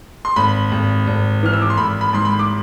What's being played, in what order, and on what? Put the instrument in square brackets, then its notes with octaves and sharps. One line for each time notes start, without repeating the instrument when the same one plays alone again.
[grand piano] C6
G#1 B5
G#1
G#1
E3 F6
E6
D6
C6
G#1 B5
B5
G#2 C6
B5
D6